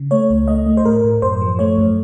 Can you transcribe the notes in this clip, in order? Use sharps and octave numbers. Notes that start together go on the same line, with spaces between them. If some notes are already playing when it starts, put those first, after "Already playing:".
Already playing: C#3
A3 C#5
C#2
A3 D#5
A3
C5
A2 A#4
A2
F#2 C5
F3
A3 C#5
F#2